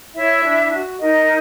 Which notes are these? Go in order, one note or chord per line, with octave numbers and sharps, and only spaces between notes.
E4 C#5 E5
D4
F#4
D#4 A#4 D#5